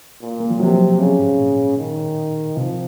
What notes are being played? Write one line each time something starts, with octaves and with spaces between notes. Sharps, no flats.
A#2
A#3
F3
C3 F#3
C#3
G#2
A#2
D#3
C3 F3